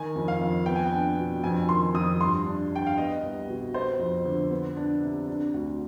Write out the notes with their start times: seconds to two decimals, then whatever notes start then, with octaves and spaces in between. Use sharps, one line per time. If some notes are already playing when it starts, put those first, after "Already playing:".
Already playing: D#3 G#5
0.16 F2
0.28 F5
0.41 F2
0.66 B3 G5
0.76 G#5
0.87 G5
0.92 D4
1.18 B2
1.43 F2 G#5
1.69 D#3 C6
1.94 F2 D#6
2.20 G2 C6
2.46 D4
2.72 D4 G5
2.86 F5
2.97 B3 D#5
3.23 C2
3.48 B2
3.74 B3 C5
3.99 F2
4.25 D3
4.51 B3
4.77 D4
5.02 C3
5.27 D4
5.54 D2